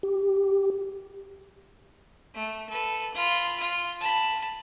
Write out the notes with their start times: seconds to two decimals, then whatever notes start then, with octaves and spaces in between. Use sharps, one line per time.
0.03 G4
2.35 A3
2.70 A4 B4
3.14 F4 B5
3.60 F4
4.01 A5 B5